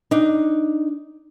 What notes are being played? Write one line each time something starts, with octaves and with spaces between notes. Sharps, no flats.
D4 D#4